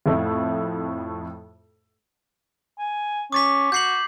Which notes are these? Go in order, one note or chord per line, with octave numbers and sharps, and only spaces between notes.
F2 A2 A3
G#5
C#4 D6 A6 B6
F#4 G6 C7 F#7